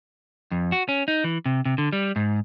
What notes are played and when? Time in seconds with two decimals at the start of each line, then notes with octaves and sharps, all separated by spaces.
0.51 F2
0.72 F#4
0.89 C#4
1.08 D#4
1.24 E3
1.46 C3
1.65 C3
1.78 D3
1.93 G3
2.16 G#2